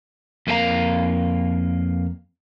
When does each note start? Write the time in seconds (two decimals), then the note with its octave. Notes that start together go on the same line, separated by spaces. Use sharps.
0.47 F2 A#3 E4 A4 F5 A#5